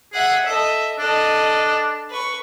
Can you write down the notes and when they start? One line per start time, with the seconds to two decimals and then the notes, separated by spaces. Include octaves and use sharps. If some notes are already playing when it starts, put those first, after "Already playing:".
0.13 G#4 E5 F#5
0.46 A4 D#5 E5
0.99 D4 A4 D#5
2.10 B4 C#6